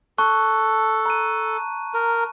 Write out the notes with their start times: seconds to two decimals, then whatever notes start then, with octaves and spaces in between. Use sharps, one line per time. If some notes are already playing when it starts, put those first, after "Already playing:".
0.18 A4 A5 C#6 F#6
1.06 A#5 F#6 D#7
1.94 A#4